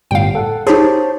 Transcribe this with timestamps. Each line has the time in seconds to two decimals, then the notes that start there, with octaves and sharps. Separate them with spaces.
0.11 G1 A2 G3 F5 G5
0.35 A4 F#5
0.67 D#4 G4 G#4 C5 C#5 A5